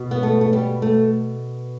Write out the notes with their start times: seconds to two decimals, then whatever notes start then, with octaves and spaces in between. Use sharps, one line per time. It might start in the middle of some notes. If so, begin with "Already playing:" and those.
Already playing: B2
0.11 B3
0.23 A3
0.41 A3
0.53 G3
0.82 A3